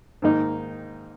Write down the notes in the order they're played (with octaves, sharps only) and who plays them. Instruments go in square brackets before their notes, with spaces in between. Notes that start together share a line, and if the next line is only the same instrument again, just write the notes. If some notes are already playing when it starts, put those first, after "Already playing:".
[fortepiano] G#2 D#3 A#3 D#4